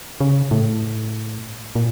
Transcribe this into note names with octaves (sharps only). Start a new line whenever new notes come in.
C#3
A2
A#2